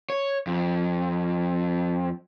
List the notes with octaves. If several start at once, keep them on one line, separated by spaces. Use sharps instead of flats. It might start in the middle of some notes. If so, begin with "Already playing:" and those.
C#5
F2